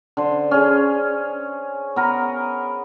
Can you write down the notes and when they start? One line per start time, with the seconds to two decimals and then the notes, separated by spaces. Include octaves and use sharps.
0.17 D3 C5
0.51 C#4 G#4
1.96 B3 A#4 A#5